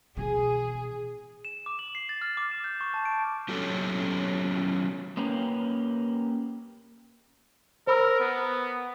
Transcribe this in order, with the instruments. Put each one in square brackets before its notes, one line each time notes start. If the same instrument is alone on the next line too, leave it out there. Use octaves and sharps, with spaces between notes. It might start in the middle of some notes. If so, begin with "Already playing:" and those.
[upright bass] B2 E3 [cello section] G#4
[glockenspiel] E7
D6
F#7
C7
A6
F6
D6
E7
G6
C#6
A5
D7
[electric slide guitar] F#3 B3 C#4 G4 A4
A#3 C#4 G4 B4
[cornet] A#4 [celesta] C5 B5 E6
[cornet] B3